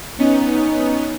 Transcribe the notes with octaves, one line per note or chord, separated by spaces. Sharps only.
B3 C#4 D#4